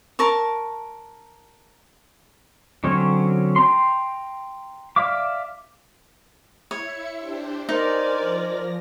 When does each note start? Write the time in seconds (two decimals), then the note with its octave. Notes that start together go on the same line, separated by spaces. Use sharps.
0.19 A#4 A5 C#6
2.84 D3 F#3 C4 C#4 C#5
3.56 G5 A#5 C6
4.96 D5 E5 F5 D6
6.71 E4 C#5 E5 C#7
7.14 D4 G4 C5
7.69 D#4 A#4 C5 D5 G#5
8.16 F3 A#6